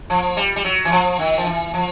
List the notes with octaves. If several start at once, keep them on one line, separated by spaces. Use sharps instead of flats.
F3
G3
G3
F#3
E3
F3
D#3
F3
E3
F3